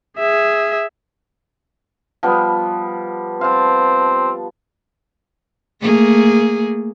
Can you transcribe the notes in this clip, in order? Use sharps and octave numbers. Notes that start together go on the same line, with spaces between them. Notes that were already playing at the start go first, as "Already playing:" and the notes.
G#4 E5
F3 G3 B3
C4 F5 A5
A3 A#3 G#4